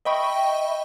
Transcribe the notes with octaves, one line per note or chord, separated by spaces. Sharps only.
D#5 E5 G5 B5 C#6